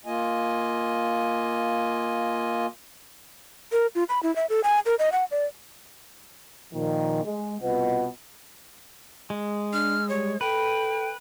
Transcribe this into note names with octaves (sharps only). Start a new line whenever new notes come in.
A#3 F4 D#5 G#5
A#4
F4
B5
E4
E5
A4
G#5
A#4
D#5
F#5
D5
A#2 D#3 F3
G#3
C2 B2 F4 B4 D#5 F#5
G#3
D4 F6
G3 C#5
A4 B4 G5